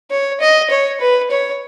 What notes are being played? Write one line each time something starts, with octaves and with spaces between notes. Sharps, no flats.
C#5
D#5
C#5
B4
C#5